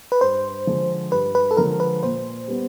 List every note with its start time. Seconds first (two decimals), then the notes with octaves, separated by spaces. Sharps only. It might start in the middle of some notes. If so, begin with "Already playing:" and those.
0.12 B4
0.21 G2 C5
0.66 D3 F3 G#3
1.12 G2 B4
1.35 B4
1.51 A4
1.57 D3 F3 G#3 A#4
1.80 B4
2.03 A#2 C5
2.48 G3 B3